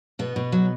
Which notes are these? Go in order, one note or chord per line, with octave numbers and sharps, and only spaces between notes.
B2 B3
B2
F#3